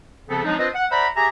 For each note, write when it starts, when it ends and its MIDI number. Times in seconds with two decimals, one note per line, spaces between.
0.29 0.44 49
0.29 0.44 53
0.29 0.44 59
0.29 0.44 60
0.29 0.44 69
0.44 0.56 53
0.44 0.56 54
0.44 0.56 56
0.44 0.56 60
0.44 0.56 62
0.44 0.56 63
0.58 0.68 60
0.58 0.68 62
0.58 0.68 65
0.58 0.68 71
0.58 0.68 72
0.58 0.68 75
0.75 0.86 78
0.91 1.07 72
0.91 1.07 74
0.91 1.07 76
0.91 1.07 78
0.91 1.07 82
0.91 1.07 83
1.16 1.28 67
1.16 1.28 68
1.16 1.28 76
1.16 1.28 80
1.16 1.28 82